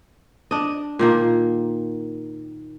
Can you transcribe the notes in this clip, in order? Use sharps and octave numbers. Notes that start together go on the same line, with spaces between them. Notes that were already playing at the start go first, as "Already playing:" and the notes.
D4 D#5
A#2 D#3 A#3